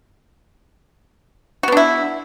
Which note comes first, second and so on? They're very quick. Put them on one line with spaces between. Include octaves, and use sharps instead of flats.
F#4 B3 D4 E4